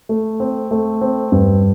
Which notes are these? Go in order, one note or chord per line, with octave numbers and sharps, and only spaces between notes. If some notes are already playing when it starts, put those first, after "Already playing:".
A3
C4
A3
C4
G2